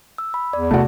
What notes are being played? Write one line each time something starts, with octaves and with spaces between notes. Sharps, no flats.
E6
B5
E2 D5
C3 A3 F#4